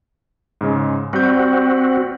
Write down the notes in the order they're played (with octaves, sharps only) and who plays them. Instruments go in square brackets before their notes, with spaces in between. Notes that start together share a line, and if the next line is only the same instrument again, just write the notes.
[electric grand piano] G#2 C#3 G#3
[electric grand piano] G3 G6 [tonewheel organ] C4 F#4